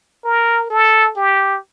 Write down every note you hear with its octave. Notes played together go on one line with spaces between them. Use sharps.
A#4
A4
G4